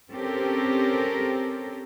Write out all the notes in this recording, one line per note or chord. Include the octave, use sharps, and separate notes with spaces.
C4 C#4 G4 A4 A#4